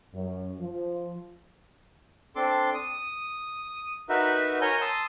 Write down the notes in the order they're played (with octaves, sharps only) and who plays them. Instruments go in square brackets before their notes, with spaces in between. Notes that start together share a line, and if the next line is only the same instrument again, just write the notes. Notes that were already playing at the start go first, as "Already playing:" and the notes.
[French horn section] F#2
F3
[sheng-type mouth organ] C4 D4 A4 C6 D6
D#6
D#4 F#4 A#4 B4 E5
A#4 C#5 G#5 A#5 G6
A5 C6 D#6 E6